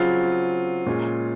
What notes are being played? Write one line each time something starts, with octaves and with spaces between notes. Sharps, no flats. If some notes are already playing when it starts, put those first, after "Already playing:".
Already playing: C#3 F#3 C4 F4
A#2 G#3 C#4